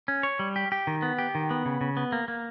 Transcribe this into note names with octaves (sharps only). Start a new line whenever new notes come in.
C#4
C#5
G3
G4
G4
D#3
B3
G4
D#3
B3
C#3
C#3
B3
A#3
A#3